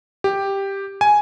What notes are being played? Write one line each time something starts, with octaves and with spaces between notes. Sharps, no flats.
G4
G#5